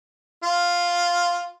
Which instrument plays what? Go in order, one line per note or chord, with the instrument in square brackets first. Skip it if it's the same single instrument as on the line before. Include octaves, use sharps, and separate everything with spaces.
[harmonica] F4